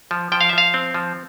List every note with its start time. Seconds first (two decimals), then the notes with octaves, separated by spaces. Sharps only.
0.11 F3
0.32 F3 G5
0.41 F5
0.49 E5
0.53 F3 F5
0.74 C4
0.94 F3